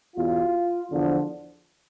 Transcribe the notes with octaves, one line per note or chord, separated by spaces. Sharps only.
E2 B2 F4
E2 D3 F3